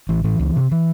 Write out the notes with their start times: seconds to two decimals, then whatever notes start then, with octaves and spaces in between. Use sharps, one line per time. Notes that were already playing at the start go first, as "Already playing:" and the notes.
0.09 A1 E3
0.24 A2 E3
0.39 C#2
0.56 C3
0.71 E3